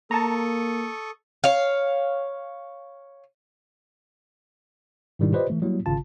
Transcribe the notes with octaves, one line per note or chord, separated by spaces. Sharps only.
A#3 A4 A5 A#5 C#6 D#6
C#5 F5
G#2 B2 D#3 G3 D4 E4
F4 G4 B4 C5 D5 D#5
E3 A3
F#3 G3 A#3 E4
G#1 C#3 F4 A5